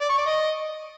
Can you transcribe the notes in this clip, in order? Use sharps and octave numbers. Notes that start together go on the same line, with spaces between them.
D5
C#6
D5
D#5